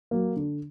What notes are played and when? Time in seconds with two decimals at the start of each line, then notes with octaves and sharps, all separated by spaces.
0.11 F#3 A#3
0.36 D3